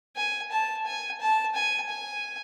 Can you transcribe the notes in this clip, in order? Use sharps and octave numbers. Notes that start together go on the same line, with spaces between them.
G#5
A5
G#5
A5
G#5
G#5